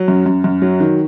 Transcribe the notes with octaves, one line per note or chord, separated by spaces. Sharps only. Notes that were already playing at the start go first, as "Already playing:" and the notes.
Already playing: F#3
F#2
F#2
F#2
F#3
D#3